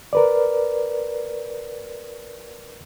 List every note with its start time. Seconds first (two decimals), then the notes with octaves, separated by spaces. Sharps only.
0.13 A#4 B4 D5